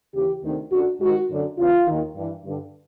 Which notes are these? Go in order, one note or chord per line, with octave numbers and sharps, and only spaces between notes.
D#2 C#3 E3 G4
D2 C3 D#3
F#2 D3 F#4
G#2 D#3 F#4
F#2 D3
E2 C#3 E3 F4
D#2 D#3
G2 E3
G2 D3